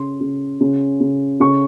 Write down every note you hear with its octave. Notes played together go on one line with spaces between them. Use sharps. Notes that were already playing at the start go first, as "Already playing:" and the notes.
Already playing: C#3 C6
C#3
C#3
C#3
C#3 C#6